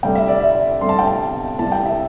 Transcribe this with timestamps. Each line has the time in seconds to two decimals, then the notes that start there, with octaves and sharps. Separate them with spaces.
0.03 D2 C3 G3 G5
0.15 E5
0.28 D5
0.40 E5
0.81 D2 C3 G3 C6
0.89 A5
0.99 G5
1.07 A5
1.59 C2 C3 G3 A5
1.72 G5
1.85 E5